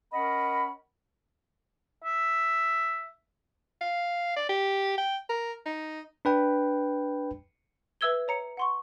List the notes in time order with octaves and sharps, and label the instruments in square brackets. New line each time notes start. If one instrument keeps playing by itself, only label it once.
[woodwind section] C#4 A#4 D#5 F#5 B5
[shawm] E5
[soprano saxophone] F5
D5
G4
G5
A#4
D#4
[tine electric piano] D4 B4 G5
[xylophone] B4 E5 E6 G#6 G7
C#5 A#5 C#7
F#5 C6 C#6